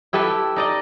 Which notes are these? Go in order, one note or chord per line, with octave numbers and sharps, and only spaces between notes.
E4 G4 A4 B4 E5
D#4 D5 D#5